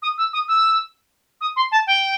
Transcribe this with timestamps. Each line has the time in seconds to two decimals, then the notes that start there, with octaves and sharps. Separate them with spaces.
0.02 D#6
0.18 E6
0.33 D#6
0.48 E6
1.41 D#6
1.56 C6
1.72 A5
1.87 G5